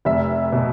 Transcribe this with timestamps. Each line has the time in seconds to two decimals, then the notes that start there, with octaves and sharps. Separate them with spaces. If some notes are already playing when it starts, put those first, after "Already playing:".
0.05 F1 E5
0.53 B2